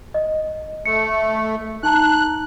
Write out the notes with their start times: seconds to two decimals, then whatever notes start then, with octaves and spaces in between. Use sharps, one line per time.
0.14 D#5
0.86 A3 C#7
1.83 D#4 A5 A#5 F#6